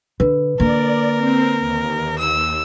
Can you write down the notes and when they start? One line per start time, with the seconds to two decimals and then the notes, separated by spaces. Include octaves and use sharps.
0.20 D3 B4
0.60 D3 A#3 A#4 D5
1.16 C4
1.60 D#2
2.19 E6